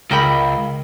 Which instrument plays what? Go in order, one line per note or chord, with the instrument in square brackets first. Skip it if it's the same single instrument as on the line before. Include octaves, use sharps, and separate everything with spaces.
[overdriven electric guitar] C#2 [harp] A#4 G5 B5